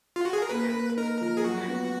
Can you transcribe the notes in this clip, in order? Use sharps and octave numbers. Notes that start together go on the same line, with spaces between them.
F4
F#4
G#4
A#4
A#3 B4
A#3
D#4 A#4
F3
G#4
F#3 F#4
B3